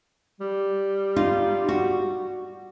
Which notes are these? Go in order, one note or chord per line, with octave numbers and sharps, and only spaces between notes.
G3
D#4 F4
F#4